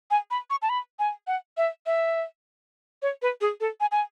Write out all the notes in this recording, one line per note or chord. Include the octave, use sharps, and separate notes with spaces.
G#5
B5
C#6
A5
B5
G#5
F#5
E5
E5
C#5
B4
G#4
A4
G#5
G#5